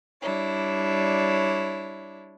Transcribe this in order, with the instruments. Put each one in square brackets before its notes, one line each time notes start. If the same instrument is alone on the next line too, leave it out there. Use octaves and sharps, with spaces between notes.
[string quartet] G3 D4 E4 C#5